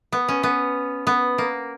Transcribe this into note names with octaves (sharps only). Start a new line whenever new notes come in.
B3
C#4
B3
B3
A#3